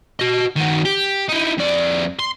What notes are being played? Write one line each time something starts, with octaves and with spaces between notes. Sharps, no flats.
F#4 D#5
D#3 F#4
G4
D#4 E4
F2 D5
C6